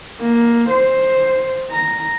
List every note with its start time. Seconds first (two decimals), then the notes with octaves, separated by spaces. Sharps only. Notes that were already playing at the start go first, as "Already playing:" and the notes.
0.20 A#3
0.70 C5
1.70 A#5